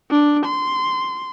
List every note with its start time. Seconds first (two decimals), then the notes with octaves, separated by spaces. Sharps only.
0.10 D4
0.46 C6